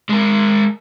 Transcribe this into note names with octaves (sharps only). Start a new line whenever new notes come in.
G#3 A#4